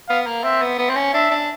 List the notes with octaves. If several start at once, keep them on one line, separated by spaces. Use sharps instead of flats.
B3 F5
A#3
C4 E5
B3
B3
C4
C#4
D4 E5
D4